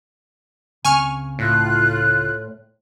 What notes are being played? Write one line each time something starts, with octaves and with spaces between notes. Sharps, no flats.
C#2 C#3 C4 G#5 C#6 F6
A2 F4 F#6